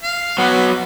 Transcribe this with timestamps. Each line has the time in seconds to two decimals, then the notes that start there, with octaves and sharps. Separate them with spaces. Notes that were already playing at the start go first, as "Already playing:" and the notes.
0.03 F5
0.38 F#3 B3 F#4 B4